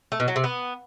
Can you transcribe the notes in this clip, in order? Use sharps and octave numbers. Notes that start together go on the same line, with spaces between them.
A3
B2
F#3
C3
B3